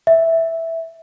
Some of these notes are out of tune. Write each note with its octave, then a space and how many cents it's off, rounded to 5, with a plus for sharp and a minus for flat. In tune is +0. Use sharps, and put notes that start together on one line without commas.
E5 -5